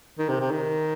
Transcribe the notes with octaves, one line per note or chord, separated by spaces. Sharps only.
D#3
C3
C3
D#3